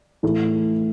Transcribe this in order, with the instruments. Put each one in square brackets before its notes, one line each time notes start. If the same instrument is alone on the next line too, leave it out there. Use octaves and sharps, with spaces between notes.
[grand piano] A2 E3 A3 E4